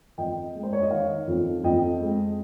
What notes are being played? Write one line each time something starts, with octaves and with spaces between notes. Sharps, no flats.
F2 D#5 G5
G#3
C5
C#5
D#5
D#3 C#5 F5
F2
F2 D#5 G5
G#3